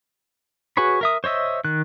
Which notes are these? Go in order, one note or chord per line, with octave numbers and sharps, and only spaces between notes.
F#4 G#4 B4 C#5 B5
A#4 E5 D#6
C5 C#5 D#5 E5
D#3 F#6